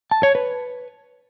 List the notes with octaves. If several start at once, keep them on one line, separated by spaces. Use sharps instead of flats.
A5
C#5
B4